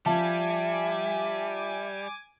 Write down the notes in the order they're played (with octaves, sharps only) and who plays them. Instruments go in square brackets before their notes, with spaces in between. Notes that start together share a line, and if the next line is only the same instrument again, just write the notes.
[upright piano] F3 A5 [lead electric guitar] G3 [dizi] E5 [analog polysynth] G#5 D6